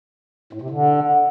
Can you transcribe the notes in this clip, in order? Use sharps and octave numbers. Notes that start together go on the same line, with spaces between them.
A2
C3
D3